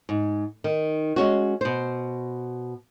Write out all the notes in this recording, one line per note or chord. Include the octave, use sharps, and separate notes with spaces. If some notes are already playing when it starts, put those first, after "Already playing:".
G#2
D#3
G#3 C#4 F#4
B2 C5